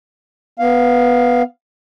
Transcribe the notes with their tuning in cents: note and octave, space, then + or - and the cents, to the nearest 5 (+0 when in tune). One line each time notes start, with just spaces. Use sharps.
B3 +0 F5 +0